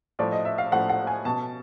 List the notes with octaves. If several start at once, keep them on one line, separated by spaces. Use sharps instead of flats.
A2 F3 D5
D#5
E5
F5
A2 F3 F#5
F#5
G#5
B2 A5